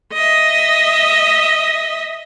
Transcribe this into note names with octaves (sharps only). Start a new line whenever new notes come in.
D#5 E5